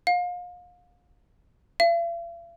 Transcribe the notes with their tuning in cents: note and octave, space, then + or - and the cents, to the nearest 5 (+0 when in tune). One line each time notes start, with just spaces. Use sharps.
F5 +35
F5 -45